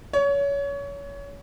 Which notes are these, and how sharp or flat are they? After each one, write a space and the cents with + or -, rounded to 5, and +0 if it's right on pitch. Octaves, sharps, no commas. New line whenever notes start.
C#5 +25